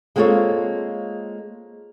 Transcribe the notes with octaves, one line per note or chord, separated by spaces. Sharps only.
G#3 A#3 C4 F4 A4 C#5